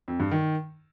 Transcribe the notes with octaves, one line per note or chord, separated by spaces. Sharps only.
F2
G2
D#3